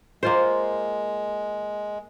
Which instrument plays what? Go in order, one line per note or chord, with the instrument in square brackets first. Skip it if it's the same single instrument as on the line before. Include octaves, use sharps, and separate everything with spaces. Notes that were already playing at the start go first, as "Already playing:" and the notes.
[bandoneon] G#3 [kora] A#3 F4 C5